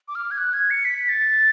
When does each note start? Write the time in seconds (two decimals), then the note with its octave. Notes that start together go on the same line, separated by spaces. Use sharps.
0.08 D6
0.15 F6
0.31 G#6
0.38 F#6
0.53 G#6
0.70 C#7
0.85 B6
1.09 A6